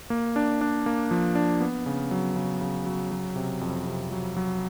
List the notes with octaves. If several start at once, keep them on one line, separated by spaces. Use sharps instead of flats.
A#3
D4
D4
A#3
F3
D4
B3
C#3
F#3
C#3
C#3
F#3
F#3
C3
F2
C3
F#3
F#3